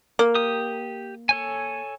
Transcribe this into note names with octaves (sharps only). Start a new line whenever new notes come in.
A#3
G4 D#6
A4 C#5 G#5